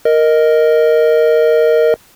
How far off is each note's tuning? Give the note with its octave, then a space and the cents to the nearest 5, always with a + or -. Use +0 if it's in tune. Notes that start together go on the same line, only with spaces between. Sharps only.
A#4 +0 D#5 +0